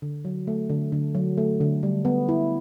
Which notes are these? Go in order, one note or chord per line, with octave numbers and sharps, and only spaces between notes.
D3
F#3
A3
D3
D3
F#3
A3
D3
G3
B3
E4